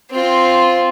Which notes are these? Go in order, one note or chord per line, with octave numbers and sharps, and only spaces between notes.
C4 F4